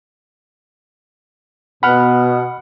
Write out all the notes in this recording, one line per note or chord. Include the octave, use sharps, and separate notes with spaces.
B2 B3 F#5 B5 F6